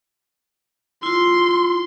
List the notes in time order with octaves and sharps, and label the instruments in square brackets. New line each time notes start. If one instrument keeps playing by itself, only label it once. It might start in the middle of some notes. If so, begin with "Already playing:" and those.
[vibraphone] E4 F4 [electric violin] C6